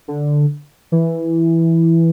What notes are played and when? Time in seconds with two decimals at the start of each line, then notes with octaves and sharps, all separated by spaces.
0.08 D3
0.92 E3